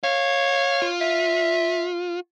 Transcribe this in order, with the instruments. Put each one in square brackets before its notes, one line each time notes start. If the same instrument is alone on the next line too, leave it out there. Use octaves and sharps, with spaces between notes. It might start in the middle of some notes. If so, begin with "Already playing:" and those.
[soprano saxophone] C#5 [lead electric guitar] F5
[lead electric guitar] F4
[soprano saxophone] E5